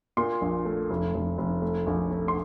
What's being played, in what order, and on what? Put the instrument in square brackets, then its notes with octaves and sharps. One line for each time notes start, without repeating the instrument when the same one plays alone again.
[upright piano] A#2 C6
A#1
A3
F1
F1
F1
A3
A#1
A3
C6